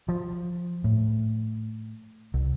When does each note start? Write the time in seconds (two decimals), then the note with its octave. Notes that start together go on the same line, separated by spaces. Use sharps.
0.09 F3
0.84 A2
2.34 C2